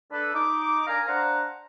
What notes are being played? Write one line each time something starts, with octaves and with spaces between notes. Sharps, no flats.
D4 A4 B4
D#4 D6
D4 A#4 F5 G#5 A#5
D4 C5 F5 F#5 A#5